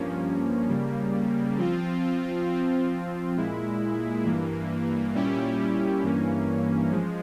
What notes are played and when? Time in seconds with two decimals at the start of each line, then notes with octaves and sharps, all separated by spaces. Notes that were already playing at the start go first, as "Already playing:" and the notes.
Already playing: G2 F3 A#3 C#4
0.69 C#3 G3 A#3
1.58 F3 C4 F4
2.47 F3 C4 F4
3.36 A#2 G#3 E4
4.25 G2 E3 A#3
5.14 A#2 G3 C#4 E4 G4
6.03 G2 E3 A#3 C#4
6.92 F3 G#3